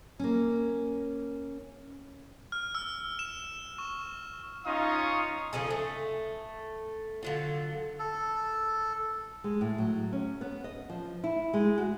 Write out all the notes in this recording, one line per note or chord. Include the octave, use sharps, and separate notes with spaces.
A#3 C#4
F6
E6
E7
C#6
C#4 D#4 F4 F5 C#6 D#6
C#3 F3 G#4 A4
A3
D3 F#3 F4
A4
G#3
A2
F#3
C#4
B3
D#5
F3
E4
G#3
F#4